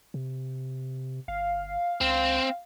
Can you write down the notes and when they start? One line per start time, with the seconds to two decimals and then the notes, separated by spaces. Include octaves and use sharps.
0.14 C3
1.28 G1 F5
2.01 C#2 C4